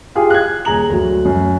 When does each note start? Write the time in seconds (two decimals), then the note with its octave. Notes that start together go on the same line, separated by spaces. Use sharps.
0.15 F4 G4 G#4 F5
0.30 F#6 G#6
0.65 D#1 G#4 A#5 F#7
0.90 D2 F#3
1.25 F#2